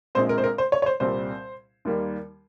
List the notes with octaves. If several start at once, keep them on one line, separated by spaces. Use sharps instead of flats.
A#1 A#2 G#3 C4 C5
A#4
C5
A#4
C5
C#5
C#5
C5
C2 A#2 G3 C4 C5
D#2 D#3 G3 A#3